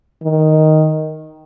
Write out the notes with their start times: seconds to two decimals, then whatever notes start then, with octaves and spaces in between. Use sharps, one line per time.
0.23 D#3